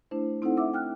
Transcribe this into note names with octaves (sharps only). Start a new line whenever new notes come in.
A3 D4 E4 C5
C4 D#4 E4 A4 C5 F#5
E5 F#5 D6 E6
G5 F6 F#6